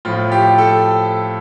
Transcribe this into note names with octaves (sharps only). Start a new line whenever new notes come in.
A2 F3 F4
G4
A4